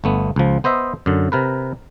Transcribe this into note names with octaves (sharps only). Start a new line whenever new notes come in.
G1 A3 B3
C#2 F3
B3 C5 D#5 E5
F#2 D3
C3 A#4 B4